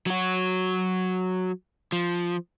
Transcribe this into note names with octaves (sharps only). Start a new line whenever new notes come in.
F#3 F#4
F3